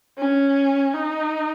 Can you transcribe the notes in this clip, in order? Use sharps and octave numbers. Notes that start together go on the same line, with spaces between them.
C#4
D#4